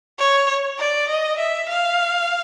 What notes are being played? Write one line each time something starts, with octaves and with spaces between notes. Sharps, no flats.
C#5
D5
D#5
E5
F5